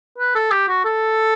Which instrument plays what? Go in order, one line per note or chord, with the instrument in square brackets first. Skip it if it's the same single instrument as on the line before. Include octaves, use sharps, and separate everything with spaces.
[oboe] B4
A4
G4
F#4
A4